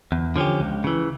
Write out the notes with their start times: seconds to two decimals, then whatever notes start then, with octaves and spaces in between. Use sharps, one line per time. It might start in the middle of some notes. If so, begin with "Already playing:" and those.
0.12 E2
0.36 D3 F3 C#4 G4
0.60 C#2
0.84 C#3 E3